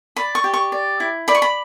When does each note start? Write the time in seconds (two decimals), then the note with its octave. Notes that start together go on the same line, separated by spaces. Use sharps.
0.16 D5 B5
0.35 C#6
0.44 G4
0.54 C#6
0.72 D5
1.00 E4
1.28 D5 B5
1.35 C#6
1.42 B5